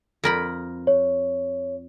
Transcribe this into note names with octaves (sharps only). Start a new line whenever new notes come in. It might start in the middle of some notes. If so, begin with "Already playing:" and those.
F2 A#4 B5
C#5